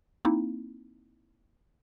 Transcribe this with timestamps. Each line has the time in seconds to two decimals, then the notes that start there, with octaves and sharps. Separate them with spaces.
0.25 A#3 C4 D#4 E4